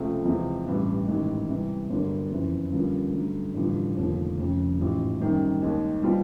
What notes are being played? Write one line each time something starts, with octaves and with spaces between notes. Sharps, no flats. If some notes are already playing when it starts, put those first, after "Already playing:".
Already playing: C#2 C3 F3 A3 C4
E2 C3 F3 G#3 C4
A1 G2 E3
A1 G#2 D#3 G#3
C3 E3 G3
G1 G2 D3 F#3 A#3
F#1 F2 C#3 E3
G2 D3 F3 A#3 C#4
G2 D3 F#3 A3
A1 G2 D3 F3
F1 D#2 D3 F3
F1 F2 C#3
A1 G#2 F3
F#2 D#3 G3 C4
D#2 D#3 G#3
B2 G3 C4 F4